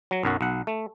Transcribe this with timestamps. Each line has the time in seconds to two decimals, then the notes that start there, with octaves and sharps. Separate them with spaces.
0.11 F#3
0.23 B1 F#2 F#4
0.41 B1 F#5
0.67 A3